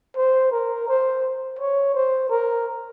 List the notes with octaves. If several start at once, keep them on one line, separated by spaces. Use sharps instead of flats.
C5
A#4
C5
C#5
C5
A#4